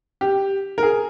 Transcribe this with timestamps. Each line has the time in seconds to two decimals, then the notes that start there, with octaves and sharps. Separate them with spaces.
0.21 G4
0.78 A#4
0.83 G#4